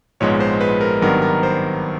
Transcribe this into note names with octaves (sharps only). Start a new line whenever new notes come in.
A#1 G#2 F3 G#3 B3 C#5
C5
B4
A#4
G#1 G2 D#3 F#3 B3 A#4
A#4
C5